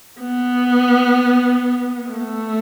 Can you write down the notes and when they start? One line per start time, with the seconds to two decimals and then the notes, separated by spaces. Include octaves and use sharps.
0.21 B3
2.09 A3